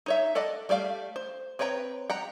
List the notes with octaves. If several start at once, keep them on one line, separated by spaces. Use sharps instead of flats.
D#4 C#5 E5
A4 D5 D#5 F#5
G3 A3 D5 F5
C5
C4 B4 C#5 G5 A#5
F#5 G5 A#5